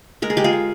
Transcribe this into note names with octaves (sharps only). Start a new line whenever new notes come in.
G#3 A#4
G#4
G#3 G4
F4 G#4
G#3